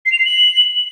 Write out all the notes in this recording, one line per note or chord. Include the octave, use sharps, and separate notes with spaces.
C7
F7
C7
F#7